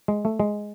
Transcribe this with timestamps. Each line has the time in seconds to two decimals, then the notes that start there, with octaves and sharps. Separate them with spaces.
0.08 G#3
0.25 A3
0.40 G#3